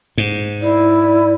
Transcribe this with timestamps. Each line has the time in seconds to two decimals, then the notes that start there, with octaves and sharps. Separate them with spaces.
0.18 G#2
0.62 E4 D5